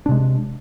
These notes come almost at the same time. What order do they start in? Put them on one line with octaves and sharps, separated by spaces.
D4 C3 G#3